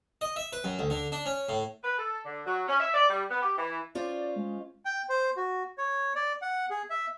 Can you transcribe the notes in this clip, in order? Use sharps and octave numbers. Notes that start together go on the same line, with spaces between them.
D#5
E5
B4
F#2
D2
D3
D4
C#4
A2
B4
A4
D3
F#3
C#4
E5
D5
G3
B3
G4
E3
C#4 F4 C5 D5
G#3
G5
C5
F#4
C#5
D5
F#5
G#4
E5